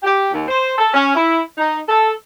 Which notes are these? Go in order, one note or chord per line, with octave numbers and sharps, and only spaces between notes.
G4
D#2
C5
A4
C#4
E4
D#4
A4